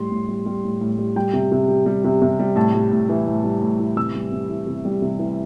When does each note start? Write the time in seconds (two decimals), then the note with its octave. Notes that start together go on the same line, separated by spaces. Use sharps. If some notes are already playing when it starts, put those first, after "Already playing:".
Already playing: A2 G3 C6
0.11 A2
0.28 G3
0.46 G3
0.64 A2
0.81 A2
0.98 G3
1.16 G3 G5
1.33 C3
1.52 C3
1.68 G3
1.86 G3
2.04 C3
2.22 C3
2.39 G3
2.56 A2 A5
2.74 G3
2.92 A2
3.09 E3
3.26 A2
3.44 G3
3.62 A2
3.79 E3
3.96 C3 E6
4.14 G3
4.32 C3
4.49 E3
4.67 C3
4.85 G3
5.02 C3
5.19 E3